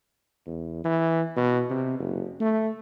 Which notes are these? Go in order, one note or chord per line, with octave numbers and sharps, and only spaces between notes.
E2
E3
B2
C3
F#1
A3